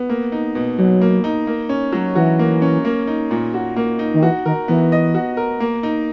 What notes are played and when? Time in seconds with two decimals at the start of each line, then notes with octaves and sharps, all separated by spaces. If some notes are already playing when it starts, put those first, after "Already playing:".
Already playing: B3
0.09 A#3
0.32 D#4
0.55 B2
0.78 B2 F#3
1.01 A#3
1.24 D#4
1.47 A#3
1.69 C#4
1.92 F#3
2.15 E3 F#4
2.39 A#3
2.62 C#4
2.85 A#3
3.07 D#4
3.31 A#2
3.54 F#4
3.76 A#3
3.99 D#4
4.14 D#3
4.22 E3 F#4
4.45 D#3 A#4
4.68 E3 B3
4.92 D#5
5.15 F#4
5.37 A#4
5.60 A#3
5.83 D#4